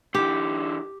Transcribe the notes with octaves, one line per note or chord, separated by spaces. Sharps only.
D3 E3 G4